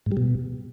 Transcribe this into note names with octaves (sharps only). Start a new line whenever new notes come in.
G#2
G3
B2